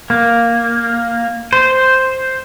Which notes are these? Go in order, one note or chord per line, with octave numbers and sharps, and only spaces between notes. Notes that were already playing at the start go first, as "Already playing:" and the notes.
A#3
C5